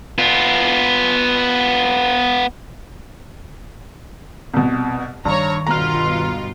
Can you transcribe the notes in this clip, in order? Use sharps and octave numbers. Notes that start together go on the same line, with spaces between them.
B3 F4
C2 B2
G2 D#3 C#5 A#5
G1 B2 F4 A#5 F6